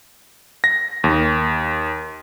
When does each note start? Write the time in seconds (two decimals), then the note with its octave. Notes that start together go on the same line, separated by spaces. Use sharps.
0.64 A#6
1.04 D#2